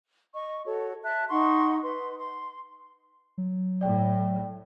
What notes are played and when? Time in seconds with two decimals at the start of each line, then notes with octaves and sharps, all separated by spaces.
0.33 D#5 C#6
0.65 F#4 A4 C#5
1.04 E5 A5 F#6
1.29 D#4 F#5 C6 C#6
1.84 B4 C6
2.18 C6
3.38 F#3
3.81 A2 D5 G5